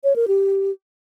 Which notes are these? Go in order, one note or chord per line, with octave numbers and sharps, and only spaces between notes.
C#5
A#4
G4